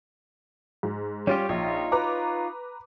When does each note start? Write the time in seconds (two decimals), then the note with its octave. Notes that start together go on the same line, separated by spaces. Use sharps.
0.83 G#2
1.27 G3 C#4 F4 G4
1.49 A#1 D#4 F4 C#5
1.92 B4 A#5 D6